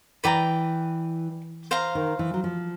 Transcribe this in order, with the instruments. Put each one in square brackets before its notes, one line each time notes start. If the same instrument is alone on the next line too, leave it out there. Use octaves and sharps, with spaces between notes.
[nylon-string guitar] E3 [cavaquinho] B4 D5 G5 A#5
[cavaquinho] C5 F5 A#5
[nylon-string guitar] D#3
E3
F#3
F3